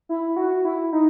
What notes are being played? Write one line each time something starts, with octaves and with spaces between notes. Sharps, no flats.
E4
F#4
E4
D#4